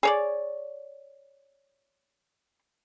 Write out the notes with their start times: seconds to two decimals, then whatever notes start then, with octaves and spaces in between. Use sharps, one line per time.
0.03 G#4 C#5 D5